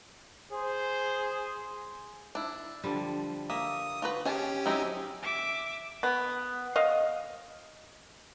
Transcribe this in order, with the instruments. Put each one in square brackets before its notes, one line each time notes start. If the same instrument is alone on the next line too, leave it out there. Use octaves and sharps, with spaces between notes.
[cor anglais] G#4 [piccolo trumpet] C5
[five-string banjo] D4 E4
[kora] D3 F3 G3
[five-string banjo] A#3 [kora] E5 [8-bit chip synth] D#6
[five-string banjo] F4 F#4 B4
[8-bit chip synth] C#4 G4 [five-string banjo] G#4 G#5 A5
[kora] F#3 G#4 [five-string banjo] C4 D#4 E4
[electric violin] E5 D6
[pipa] B3
D#5 F5